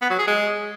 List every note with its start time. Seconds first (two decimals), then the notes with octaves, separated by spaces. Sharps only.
0.02 B3
0.10 F#3
0.19 G#4
0.27 G#3